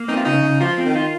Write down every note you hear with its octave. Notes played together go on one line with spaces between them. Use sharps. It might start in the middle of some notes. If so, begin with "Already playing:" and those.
Already playing: A#3
C4 D#4
F4
C#3 D#4
C#3
F3 F4
C4
D#3
F4